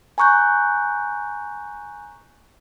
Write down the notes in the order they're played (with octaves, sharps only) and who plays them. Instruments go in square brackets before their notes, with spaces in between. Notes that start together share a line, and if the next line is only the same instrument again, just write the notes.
[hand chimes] G#5 A#5 C#6 F#6 G6